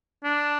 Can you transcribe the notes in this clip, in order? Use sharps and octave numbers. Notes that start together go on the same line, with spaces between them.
D4